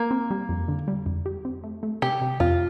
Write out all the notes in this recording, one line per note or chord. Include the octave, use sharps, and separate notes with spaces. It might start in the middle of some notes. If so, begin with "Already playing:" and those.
Already playing: A#3
C4
G3
F2
D3
G3
F2
G4
C4
A3
A3
C3 G4
C3
F2 F4